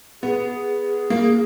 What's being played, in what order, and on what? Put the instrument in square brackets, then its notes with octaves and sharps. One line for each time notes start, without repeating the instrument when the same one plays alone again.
[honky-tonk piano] B3 [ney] G#4
[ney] G#4
[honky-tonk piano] A#3